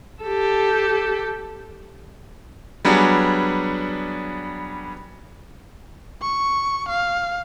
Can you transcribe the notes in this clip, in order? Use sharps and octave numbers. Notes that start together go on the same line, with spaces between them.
G4 A4
F#3 G3 B3 D4 G#4
C#6
F5